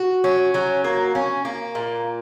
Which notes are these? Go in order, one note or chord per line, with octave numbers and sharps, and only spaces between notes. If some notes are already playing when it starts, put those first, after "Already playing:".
Already playing: F#4
C#4
F#3
A#3
C#4
A#3
A#2